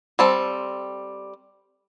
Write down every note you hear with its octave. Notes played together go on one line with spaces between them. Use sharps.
G3 C4 A4